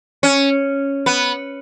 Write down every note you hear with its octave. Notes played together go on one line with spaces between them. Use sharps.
C#4
B3